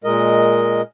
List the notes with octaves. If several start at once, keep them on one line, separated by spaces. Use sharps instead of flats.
A#2 G#3 A#4 D#5